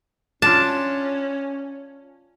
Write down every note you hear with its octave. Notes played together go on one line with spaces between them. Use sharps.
C#4 D4 F4 A5